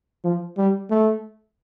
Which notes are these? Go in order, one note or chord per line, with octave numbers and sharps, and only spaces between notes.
F3
G3
A3